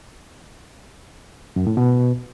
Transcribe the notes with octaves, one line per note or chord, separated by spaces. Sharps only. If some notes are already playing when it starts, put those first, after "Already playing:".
F#2
A2
B2